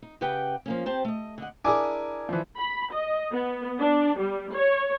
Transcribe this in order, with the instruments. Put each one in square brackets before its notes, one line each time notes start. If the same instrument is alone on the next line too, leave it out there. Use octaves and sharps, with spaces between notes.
[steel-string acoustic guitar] D#4
C#3 G4 B4 F#5 G5
F3 A#3 C#4
C4 G4 C5 A5
A3 D#5
D3 D#5 F#5
[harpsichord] D4 E4 G#4 [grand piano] A#4 G#5 D6
[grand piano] E3 F3
[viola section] B5
D#5
B3
D4
G3
C#5